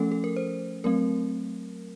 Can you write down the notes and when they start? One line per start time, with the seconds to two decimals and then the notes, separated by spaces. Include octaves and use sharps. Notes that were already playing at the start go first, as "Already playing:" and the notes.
Already playing: F3 A3 C#4 A4
0.12 A4
0.24 A#4
0.36 C5
0.84 F#3 A3 C4 A#4